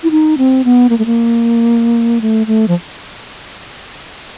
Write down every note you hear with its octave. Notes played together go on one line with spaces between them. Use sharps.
E4
D#4
C4
B3
A#3
A3
A#3
A3
A3
F3